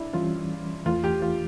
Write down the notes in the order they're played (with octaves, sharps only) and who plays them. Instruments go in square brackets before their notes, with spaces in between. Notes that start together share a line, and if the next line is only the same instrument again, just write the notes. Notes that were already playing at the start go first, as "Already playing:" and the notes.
Already playing: [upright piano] D4 E4
[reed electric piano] E3 G3 C#4 [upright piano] F4
[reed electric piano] E2 E3 A3 [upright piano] F4
[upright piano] G4
F4